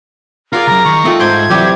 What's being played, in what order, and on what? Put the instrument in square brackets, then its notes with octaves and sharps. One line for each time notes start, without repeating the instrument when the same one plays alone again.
[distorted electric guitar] F4 [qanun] G#4 D5 F#5 [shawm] A#4
[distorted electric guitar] C#2 F#2 [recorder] A#5
[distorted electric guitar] D#3 [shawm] C#6
[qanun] A3 D#4 F4 [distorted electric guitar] C4 G5
[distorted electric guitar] G#2 [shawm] C5 [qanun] D#5 G5 D6 [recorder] G#6
[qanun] C3 E3 G3 [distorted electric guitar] F#3 [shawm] G4